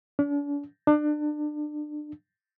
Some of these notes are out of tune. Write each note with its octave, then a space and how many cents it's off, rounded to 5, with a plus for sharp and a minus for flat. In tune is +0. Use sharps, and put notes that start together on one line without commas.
D4 -40
D4 +30